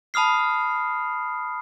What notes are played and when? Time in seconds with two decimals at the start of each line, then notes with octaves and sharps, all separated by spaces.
0.14 A5 B5 D#6 F6 C7